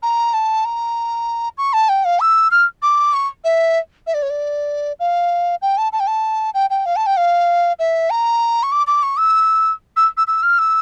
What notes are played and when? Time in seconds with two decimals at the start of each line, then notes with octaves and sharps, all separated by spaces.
0.03 A#5
0.34 A5
0.65 A#5
1.58 C#6
1.73 A5
1.89 G5
2.05 F5
2.20 E6
2.51 F6
2.82 D6
3.14 C#6
3.44 E5
4.07 E5
4.14 D5
4.22 C#5
4.30 D5
5.00 F5
5.62 G5
5.78 A5
5.92 A5
6.00 G5
6.07 A5
6.54 G5
6.70 G5
6.86 F5
6.96 A5
7.06 G5
7.17 F5
7.79 E5
8.10 A#5
8.63 C#6
8.72 D6
8.87 D6
9.03 C#6
9.18 E6
9.97 E6
10.17 E6
10.27 E6
10.43 F6
10.59 E6